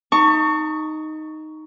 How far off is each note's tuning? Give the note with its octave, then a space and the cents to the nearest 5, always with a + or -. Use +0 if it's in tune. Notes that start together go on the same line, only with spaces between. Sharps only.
D#4 +0 A5 +40 C#6 +10